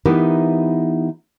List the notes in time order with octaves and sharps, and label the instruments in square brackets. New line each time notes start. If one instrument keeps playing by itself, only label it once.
[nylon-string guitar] E3 B3 D#4 E4 G4 A#4